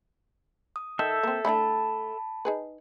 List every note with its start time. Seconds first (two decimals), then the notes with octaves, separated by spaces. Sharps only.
0.76 D#6
0.99 D#3 A4 E5 G6
1.23 A#3 C4
1.45 A3 D4 E4 A5 B5
2.45 D#4 G#4 B4